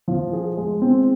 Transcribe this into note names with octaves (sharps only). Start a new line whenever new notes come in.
F3
G#4
G#3
C4